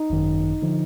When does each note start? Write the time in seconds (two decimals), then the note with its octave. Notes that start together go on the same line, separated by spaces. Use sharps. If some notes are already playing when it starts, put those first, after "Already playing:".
Already playing: D#4
0.10 G#1 F#2 D#3
0.62 D3 F3